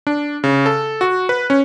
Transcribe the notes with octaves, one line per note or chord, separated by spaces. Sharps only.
D4
C#3
A4
F#4
B4
C#4